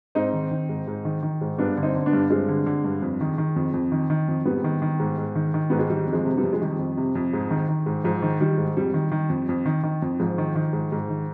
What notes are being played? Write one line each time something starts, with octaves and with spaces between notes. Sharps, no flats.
G#2 C4 D#4
D#3
D#3
G#2
G#2
D#3
D#3
G#2
G2 B3 D4
D3
C4 D#4
D3
B3 D4
G2
G2 G#3 C4
D3
D3
G2
F2
D#3
D#3
F2
F2
D#3
D#3
F2
G#2 G3 B3
D#3
D#3
G#2
G#2
D#3
D#3
G#2 B3
G#3
D#3 G3
F2
F3 G#3
C3
G3 B3
F2
G#3
D#3 G3
F2
C3
F2
G#2
D#3
D#3
G#2
G#2 F3
D#3
D#3 G3
G#2
F2 G3
D#3
D#3
F2
F2
D#3
D#3
F2
G#2 F3
D#3
D#3
G#2
G#2
D#3